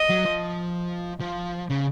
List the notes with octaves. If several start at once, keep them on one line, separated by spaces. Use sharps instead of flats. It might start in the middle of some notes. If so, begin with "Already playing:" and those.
Already playing: D#5
F#3
F3
F3
C#3